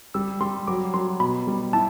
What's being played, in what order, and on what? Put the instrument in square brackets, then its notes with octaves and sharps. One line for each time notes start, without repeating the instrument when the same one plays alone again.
[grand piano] G3 [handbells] E6
[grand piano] G3 [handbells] C6
[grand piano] F#3 [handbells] D6
[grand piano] F#3 [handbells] C6
[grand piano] B2 [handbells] B5
[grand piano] G3
[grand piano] E4 [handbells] A5